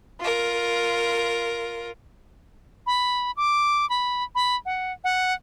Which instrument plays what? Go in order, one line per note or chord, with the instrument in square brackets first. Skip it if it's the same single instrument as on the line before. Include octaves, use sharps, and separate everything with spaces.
[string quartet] F4 A#4
[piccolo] B5
D6
B5
B5
F#5
F#5